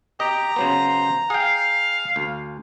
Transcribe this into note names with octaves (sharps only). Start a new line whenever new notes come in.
G4 D#5 A#5
C#3 F#3 B3 C5
G#4 F5 G5
D2